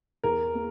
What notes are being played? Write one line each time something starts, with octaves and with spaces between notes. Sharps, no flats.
E2 A#4
A#3